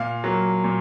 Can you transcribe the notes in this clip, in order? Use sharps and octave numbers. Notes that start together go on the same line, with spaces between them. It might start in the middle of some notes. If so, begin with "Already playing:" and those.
Already playing: A#2 F5
F#3 A#3
A#2